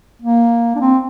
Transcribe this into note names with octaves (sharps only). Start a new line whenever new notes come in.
A#3
D4
C4